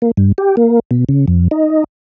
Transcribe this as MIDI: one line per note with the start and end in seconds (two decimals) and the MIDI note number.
0.02 0.11 58
0.17 0.32 43
0.38 0.56 67
0.57 0.80 58
0.91 1.04 47
1.09 1.26 49
1.28 1.48 41
1.51 1.84 63